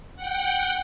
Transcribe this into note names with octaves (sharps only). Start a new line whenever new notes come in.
F#5 G5